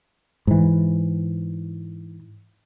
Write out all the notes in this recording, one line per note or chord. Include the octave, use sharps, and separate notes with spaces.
G#2 E3